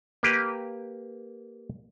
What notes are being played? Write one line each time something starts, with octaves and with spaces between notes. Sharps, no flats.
A#3 G4 B4